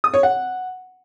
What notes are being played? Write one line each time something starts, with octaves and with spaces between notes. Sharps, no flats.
D#6
C#5
F#5